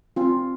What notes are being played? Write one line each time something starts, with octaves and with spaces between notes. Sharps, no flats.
C4 F4